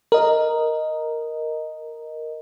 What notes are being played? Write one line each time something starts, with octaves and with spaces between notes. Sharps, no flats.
A#4 D#5